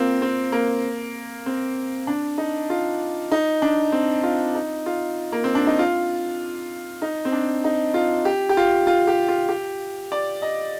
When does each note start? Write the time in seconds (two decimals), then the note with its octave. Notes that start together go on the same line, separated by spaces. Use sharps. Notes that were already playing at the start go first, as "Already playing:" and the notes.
Already playing: A#3 C4 F4
0.22 C4
0.52 A#3
1.46 C4
2.07 D4
2.38 D#4
2.70 F4
3.32 D#4
3.62 D4
3.92 C4
4.23 F4
4.55 D#4
4.86 F4
5.32 A#3
5.44 C4
5.55 D4
5.67 D#4
5.79 F4
7.02 D#4
7.25 C4
7.32 D4
7.64 D#4
7.94 F4
8.25 G4
8.49 G4
8.57 F4
8.87 F4
9.07 G4
9.28 F4
9.49 G4
10.12 D5
10.42 D#5